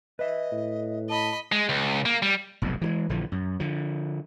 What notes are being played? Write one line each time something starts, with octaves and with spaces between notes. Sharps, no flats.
B4 D#5 E5
A2
D#5 A5 B5
G#3
C#2
A#3
G3
F1 B1 F2 G#2
E3 F3 G#3
A#1 D3 E3 F3
F#2
D3 F3